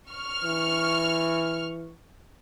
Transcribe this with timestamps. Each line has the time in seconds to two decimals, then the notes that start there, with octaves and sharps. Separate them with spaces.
0.10 C#6 F6
0.44 E3